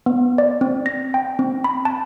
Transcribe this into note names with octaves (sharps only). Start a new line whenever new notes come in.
B3
D5
C4
A#6
G5
C4
B5
A5